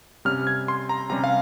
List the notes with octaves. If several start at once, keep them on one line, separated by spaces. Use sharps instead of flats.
C3 G3 C#4 F6
G#6
C6
A#5
C3 G3 C#4 A#5
F5